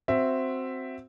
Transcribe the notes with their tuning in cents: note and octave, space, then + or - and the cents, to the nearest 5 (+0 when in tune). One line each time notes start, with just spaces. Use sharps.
C4 +0 F#4 +0 E5 +5